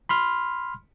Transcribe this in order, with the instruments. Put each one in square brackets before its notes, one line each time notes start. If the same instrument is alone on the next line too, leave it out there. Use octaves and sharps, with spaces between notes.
[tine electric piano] B5 C6 F6